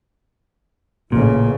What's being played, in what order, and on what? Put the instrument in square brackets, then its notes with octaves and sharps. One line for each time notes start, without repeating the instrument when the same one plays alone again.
[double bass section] A1 C#3 [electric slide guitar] A#2